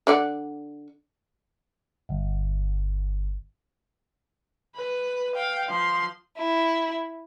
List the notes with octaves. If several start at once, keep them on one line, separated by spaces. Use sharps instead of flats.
D3 D5 F#5
G1
B4
F5 G5
F3 C6
E4